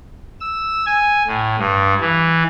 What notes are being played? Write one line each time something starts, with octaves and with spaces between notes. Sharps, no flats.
E6
G#5
A2
G2
E3